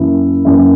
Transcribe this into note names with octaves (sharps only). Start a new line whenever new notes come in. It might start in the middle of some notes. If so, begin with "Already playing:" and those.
Already playing: F#2 E3 A#3 E4
F#2 E3 A#3 E4